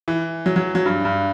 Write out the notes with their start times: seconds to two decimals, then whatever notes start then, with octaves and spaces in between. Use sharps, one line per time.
0.08 E3
0.46 F#3
0.56 F#3
0.75 F#3
0.86 G2
1.05 G2